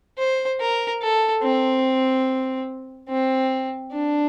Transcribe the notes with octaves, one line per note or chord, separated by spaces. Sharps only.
C5
A#4
A4
C4
C4
D4